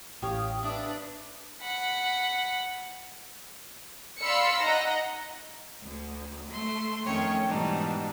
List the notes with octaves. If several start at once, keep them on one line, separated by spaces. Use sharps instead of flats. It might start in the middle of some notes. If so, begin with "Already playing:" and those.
A1 G4 C#5 F5 D#6
D4 B4 E5
F#5 B5
D5 F5 B5 C6 E6 C#7
D#4 D#5 F#5 A#5 A#6
D2
A3 C6
F2 D#3 A3 C#4 C#5 G5
G#2 B2 E3 G3 D4 D#4